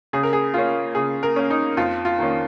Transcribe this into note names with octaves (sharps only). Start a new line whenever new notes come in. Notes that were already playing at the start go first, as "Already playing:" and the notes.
C#3 G#4
A#4
G#4
A#3 C#4 F4
C#3 G#4
A#4
A#3 C#4
D#4
F2 F4
F4
D#3 A#3 C#4